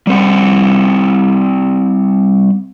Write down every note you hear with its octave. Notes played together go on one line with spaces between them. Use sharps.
G3 C4 F#5